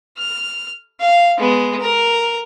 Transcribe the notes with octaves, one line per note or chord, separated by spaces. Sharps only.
F6
F5
G#3 B3
A#4